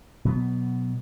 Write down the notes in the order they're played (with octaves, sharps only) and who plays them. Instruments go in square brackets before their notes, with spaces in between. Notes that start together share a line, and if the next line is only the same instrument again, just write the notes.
[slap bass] B2 F#3 B3